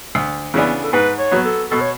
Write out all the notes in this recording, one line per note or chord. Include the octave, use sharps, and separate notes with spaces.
D2
C#3 E3 B3 D4
A4
G#2 B4
C#5
F#3 B3 F#4
A4
B2 A4
C#5